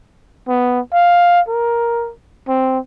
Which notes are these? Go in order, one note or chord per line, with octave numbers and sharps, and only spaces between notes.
B3
F5
A#4
C4